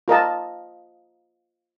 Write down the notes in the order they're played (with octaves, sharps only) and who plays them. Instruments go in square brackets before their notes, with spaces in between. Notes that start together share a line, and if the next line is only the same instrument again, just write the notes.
[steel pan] F4 A#4 D#5 A5